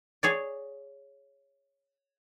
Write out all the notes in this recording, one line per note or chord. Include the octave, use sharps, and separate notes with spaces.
G#4 C#5 D5